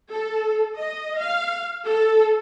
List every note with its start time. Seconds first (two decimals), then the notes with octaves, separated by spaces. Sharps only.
0.11 A4
0.77 D#5
1.19 F5
1.84 A4